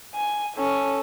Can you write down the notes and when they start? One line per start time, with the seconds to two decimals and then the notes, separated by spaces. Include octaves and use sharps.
0.15 G#5
0.57 C#4 A4